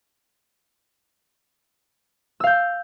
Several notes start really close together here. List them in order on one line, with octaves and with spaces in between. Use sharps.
E6 F5 G6